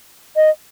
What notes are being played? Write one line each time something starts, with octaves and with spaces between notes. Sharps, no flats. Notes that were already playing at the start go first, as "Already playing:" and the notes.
D#5